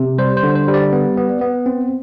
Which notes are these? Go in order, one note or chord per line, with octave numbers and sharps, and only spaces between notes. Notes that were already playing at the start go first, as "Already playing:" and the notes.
Already playing: C3
G3 C5
C5
D3
C5
G3
D5
B3
B3
B3
C4